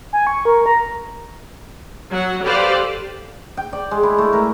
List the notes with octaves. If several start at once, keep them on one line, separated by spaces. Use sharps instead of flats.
G#5
C#6
A#4
A#5
F#3 F#5
G4 A4 B4 C5 D5 F5
G5
D5
G#3
E4
A3
A#4